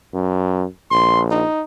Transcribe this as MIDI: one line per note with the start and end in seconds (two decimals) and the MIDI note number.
0.14 0.65 42
0.91 1.43 34
0.91 1.22 84
1.31 1.64 63